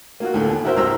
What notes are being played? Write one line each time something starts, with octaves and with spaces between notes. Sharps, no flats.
A#3 F4 F#4
D2 A2 D3
D#2
E4 F#4 A#4 C5 E5
C2 G2 E4 C5 A#5 E6